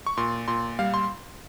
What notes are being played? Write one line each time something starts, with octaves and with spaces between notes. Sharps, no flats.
C#6
A#2 C6
A#2 C6
G3 F5
C6